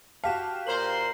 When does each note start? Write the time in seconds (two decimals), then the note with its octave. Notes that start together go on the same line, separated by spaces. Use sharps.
0.24 F#4 G4 F5 A5 B6 E7
0.67 A#2 A#4 C5 A#5 F#7